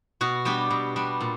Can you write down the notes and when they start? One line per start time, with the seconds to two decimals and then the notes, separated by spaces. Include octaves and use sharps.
0.21 B2 F#4
0.45 G3 B3 D4 G4
0.70 B2
0.96 G3 B3 D4
1.21 A#2